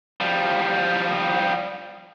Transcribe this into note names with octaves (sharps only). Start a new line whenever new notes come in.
F3 G3